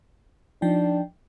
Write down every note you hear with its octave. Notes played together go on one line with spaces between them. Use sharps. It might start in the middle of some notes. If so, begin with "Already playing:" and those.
F3 D4 D#4 G5